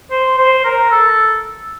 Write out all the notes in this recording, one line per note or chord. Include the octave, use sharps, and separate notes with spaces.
C5
C5
A#4
A4